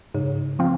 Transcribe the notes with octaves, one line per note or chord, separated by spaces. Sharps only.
G#2 C#3
F3 C4 F4